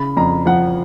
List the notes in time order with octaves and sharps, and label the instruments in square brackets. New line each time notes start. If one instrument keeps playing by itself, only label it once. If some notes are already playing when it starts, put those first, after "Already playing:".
Already playing: [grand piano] C#3 B5
F2 A#5
F3 F#5